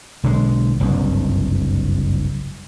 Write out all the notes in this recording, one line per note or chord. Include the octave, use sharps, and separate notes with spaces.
B1 D3 F#3 G#3
F#1 C2 G2